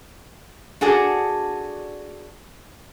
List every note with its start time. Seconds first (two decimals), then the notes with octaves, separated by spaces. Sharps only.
0.81 D4 F#4 G#4 A4 D5